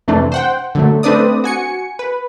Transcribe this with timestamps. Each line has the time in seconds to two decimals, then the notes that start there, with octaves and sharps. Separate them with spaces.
0.08 F2 C3 E3 A3 D4
0.32 C5 F#5 G5
0.75 D3 F#3 A3
1.03 A3 C4 D4 B4 D5 D#6
1.44 F#4 G#5 C#7
1.99 B4